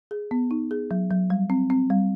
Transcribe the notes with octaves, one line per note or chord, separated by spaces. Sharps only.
G#4
B3
D#4
G#4
F#3
F#3
G3
C4
C4
G3